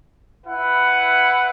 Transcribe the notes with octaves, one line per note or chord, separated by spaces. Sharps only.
E4 B4 F#5